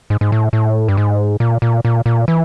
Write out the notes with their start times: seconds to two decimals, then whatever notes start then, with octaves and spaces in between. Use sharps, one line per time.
0.10 G#2
0.21 G#2
0.32 A2
0.53 A2
0.88 G2
0.97 G#2
1.40 A#2
1.62 A#2
1.85 A#2
2.06 A#2
2.28 E3